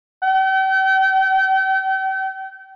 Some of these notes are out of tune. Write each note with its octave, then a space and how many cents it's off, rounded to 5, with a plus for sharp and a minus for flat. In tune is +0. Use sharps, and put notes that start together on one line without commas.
G5 -40